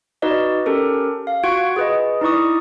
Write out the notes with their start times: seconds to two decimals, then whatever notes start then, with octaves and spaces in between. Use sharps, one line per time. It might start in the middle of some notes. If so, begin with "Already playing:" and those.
0.22 D#4 F#4 B4 D5 D#5
0.66 C#4 G4 A4 A#4
1.27 F5
1.44 F4 F#4 F#5 C#6 G#6 D7
1.76 G#4 B4 D#5
2.21 D#4 E4 D5 C#6 D#6